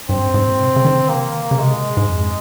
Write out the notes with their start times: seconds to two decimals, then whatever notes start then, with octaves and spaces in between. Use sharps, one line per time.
0.09 G2 C4
0.23 G#2
0.34 G#2
0.47 A#2
0.60 C3
0.76 C#3
0.85 D#3
0.97 C#3
1.09 C3 A#3
1.27 D#3
1.51 C#3
1.60 C3 G#3
1.73 A#2
1.97 G#2
2.09 F2